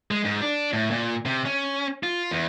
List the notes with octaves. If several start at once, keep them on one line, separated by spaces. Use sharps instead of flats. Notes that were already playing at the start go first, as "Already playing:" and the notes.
G#3
G#2
D4
A2
A#2
C3
C#4
F4
E2